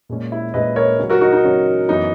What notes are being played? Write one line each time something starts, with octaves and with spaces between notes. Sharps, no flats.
A#2 G#3 C#4
E4
A#2 G#3 C#4 B4 D#5
A#4 C#5
C#3 F#3 C#4
F#4 A#4
D#4 F#4
D#4
C#3 F#3 C#4
F#2 E3 B3 D#4